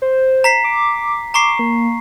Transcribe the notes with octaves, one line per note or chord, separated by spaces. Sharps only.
C5
A#5 B6 C7
D6
A#5 C#6 D6 C7
A#3